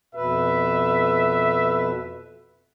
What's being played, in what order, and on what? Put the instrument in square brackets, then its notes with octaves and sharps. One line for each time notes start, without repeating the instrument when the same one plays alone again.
[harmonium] F2 B2 B4 [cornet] E5